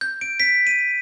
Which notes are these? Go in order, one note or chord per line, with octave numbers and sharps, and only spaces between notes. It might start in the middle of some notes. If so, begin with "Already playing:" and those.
G6
D7
B6
D#7